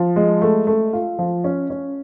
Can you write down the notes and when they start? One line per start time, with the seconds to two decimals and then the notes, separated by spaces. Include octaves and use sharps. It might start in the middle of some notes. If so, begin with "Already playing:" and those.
Already playing: F3
0.16 G#3
0.42 A3
0.67 A3
0.93 F4
1.19 F3
1.44 C#4
1.70 C#4